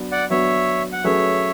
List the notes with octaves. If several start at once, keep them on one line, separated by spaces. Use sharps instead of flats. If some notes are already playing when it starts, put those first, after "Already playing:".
Already playing: F#3 B3 D4
D5 F#5
F#3 B3 D4 C#5 E5
F#5
F#3 A3 C#4 G#4 B4 C#5 E5